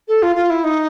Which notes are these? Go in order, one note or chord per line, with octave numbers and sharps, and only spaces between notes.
A4
F4
F4
E4
D#4